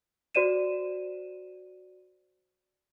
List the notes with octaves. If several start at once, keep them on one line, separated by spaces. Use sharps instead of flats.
F#4 C5 D5 D#7 E7